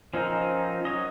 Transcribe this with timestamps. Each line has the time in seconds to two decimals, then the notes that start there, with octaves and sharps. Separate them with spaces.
0.14 F3 C4 C#4 D#4 A#4
0.85 F#3 C#5 D#5